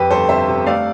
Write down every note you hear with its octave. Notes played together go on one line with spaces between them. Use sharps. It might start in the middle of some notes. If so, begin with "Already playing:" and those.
Already playing: F2 G4 B4
G1 A4 C5
C3 C5 E5
C3
A3 D5 F5